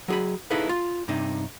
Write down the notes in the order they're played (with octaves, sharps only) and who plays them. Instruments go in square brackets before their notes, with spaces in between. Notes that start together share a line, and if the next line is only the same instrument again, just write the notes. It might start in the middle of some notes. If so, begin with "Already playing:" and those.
[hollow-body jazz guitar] F#3 G#4 B5
D#4 E4 G#4 A4 B4 F5
F4
G2 C3 D#4